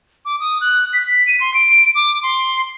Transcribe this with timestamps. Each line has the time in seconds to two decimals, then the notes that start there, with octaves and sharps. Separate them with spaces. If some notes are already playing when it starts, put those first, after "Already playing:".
0.25 D6
0.40 D#6
0.61 F#6
0.93 B6
1.27 D#7
1.41 C6
1.54 D7
1.95 D6
2.23 C6